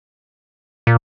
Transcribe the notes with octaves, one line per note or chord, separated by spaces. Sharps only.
A#2